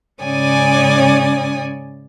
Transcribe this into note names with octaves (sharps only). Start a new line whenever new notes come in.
G#2 C#3 C#4 D5 G#5 D#6